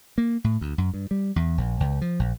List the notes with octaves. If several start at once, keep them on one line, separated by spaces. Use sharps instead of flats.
A#3
A2
D2
F#2
G2
G3
E2
A#1
C#2
F3
A#1